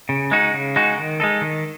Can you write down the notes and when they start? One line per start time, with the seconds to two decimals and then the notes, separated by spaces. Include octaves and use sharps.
0.09 C#3
0.31 G#3 D#4 F#4
0.54 C#3
0.76 G#3 D#4 F#4
0.98 D#3
1.20 G#3 D#4 A4
1.41 D#3